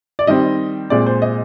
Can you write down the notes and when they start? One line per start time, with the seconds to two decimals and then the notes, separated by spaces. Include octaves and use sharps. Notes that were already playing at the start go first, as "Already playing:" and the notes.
0.19 D5
0.27 D#3 G3 C4 D#5
0.90 A#2 G#3 C4 D5
1.06 C5
1.22 D#5